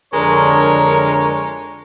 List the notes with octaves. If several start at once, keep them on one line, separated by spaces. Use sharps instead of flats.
F2 D3 G#3 D4 A#4 C#5